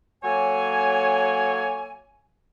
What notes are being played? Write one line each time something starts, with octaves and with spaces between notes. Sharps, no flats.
F#3 A#3 A4 C#5 G#5